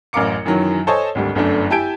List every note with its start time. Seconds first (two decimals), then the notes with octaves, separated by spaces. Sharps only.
0.13 A1 F#2 A#4 F5 D6 C#7
0.45 F#2 D#3 E3 F#3
0.87 A4 C5 C#5 D#5 G#5 A5
1.15 G#1 D2 G3
1.35 G1 F#2 D3 A3 D4
1.70 E4 G4 G#5 A5 G6 D7